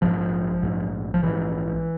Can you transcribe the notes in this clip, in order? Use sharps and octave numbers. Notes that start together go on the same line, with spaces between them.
A#1 G#2 F3
A#1 G#2
F3
A#1 G#2 E3